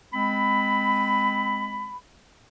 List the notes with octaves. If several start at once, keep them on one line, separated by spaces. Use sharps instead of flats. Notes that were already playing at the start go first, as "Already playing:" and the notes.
G#3 C4 B5